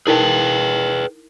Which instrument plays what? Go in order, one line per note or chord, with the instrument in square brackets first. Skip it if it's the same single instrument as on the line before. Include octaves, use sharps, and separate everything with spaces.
[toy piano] D#4 E4 A#4 [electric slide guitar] G#4 B4 G5